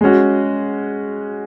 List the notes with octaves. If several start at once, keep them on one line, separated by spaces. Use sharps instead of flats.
G#3 C#4 F#4